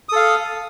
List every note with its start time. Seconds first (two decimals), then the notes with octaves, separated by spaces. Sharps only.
0.09 D#6
0.12 A4
0.16 F5